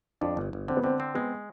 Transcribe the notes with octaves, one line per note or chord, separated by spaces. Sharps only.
F2 D4
G1
G1
D3 C4
B3
D3 C4
C4
G#3 B3